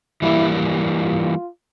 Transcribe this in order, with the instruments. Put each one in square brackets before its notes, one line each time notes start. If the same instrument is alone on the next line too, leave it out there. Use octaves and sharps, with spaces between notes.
[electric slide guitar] E3 G3 A#3 [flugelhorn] E4
[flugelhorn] F4